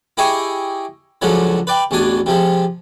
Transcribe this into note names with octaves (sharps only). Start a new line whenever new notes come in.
E4 G4 G#4 D#5 G#5 C#6
C#2 D3 F3 F#3 G#3
B4 D5 G5
A1 E2 B2 D4 G#5
C3 F3 G#3